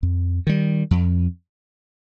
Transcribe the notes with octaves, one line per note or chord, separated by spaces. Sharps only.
F2
D#3 G3
F2